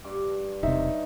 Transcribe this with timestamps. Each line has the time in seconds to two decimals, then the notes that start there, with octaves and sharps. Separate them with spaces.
0.04 G2 D6
0.63 E1 C3 D#4 E5